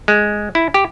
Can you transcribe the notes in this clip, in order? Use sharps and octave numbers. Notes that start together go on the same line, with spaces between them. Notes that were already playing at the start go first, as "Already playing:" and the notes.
G#3
E4
G4